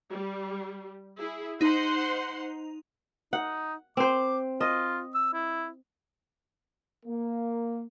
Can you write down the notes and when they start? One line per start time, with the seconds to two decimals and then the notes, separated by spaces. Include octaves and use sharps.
0.12 G3
1.18 E4 G#4
1.61 D#4 C5 F#5 C6
3.33 D#4 F#5
3.97 C4 C5 D6
4.61 F4 D#5
5.15 E6
5.34 E4
7.06 A#3